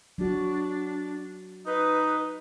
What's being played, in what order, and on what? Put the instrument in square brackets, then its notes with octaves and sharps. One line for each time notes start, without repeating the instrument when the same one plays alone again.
[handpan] F#3 F#4 [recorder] D4
[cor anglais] D#4 [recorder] B4